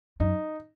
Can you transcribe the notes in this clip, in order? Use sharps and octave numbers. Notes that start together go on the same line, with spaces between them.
F#2 D#4